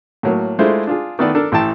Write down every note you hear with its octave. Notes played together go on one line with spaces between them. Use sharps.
A2 F#3 A#3
G#3 A3 D4 E4 F4 C5
D4 F4 G#4
D#3 A3 B3 A4 D5
D4 A4 A#4
A1 E3 G5 A5